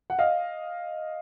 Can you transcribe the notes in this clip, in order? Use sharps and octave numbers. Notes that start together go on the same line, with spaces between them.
F#5
D#5 F5